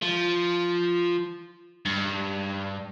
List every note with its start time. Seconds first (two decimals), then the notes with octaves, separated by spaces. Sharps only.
0.02 F3
1.86 G2